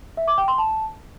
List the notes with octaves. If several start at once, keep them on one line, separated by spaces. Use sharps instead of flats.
E5
D6
G5
C6
A5